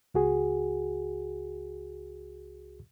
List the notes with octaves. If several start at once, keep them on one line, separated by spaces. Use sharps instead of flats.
C#2 F#4 G#4